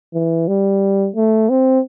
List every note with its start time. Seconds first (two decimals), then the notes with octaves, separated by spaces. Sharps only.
0.14 E3
0.48 G3
1.16 A3
1.50 C4